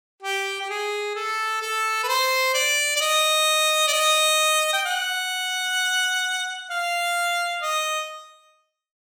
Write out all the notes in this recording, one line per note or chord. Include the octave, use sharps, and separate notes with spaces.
G4
G4
G#4
A4
A4
B4
C5
D5
D5
D#5
D5
D#5
G5
F#5
F5
D#5